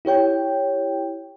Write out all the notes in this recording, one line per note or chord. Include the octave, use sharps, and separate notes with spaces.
E4 G4 C#5 G5